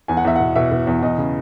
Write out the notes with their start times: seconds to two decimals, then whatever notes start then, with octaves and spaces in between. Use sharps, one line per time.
0.08 E2 G#5
0.17 F#5
0.25 E2 E5
0.36 F#5
0.40 B2
0.56 B2 E5
0.72 B2
0.87 E2
1.03 E2 D#5
1.18 C#3